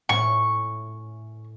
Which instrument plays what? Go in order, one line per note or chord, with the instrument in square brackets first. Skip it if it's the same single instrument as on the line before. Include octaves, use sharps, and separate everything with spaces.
[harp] A2 C#4 [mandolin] C#6